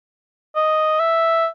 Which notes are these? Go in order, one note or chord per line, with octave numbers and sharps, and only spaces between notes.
D#5
E5